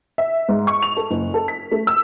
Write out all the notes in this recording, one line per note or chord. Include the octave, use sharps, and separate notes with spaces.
E5
G#2
C#6
F7
A4
F#1
A4
B6
A3
E6